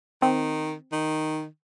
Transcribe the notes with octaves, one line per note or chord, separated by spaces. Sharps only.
D#3 C4
D#3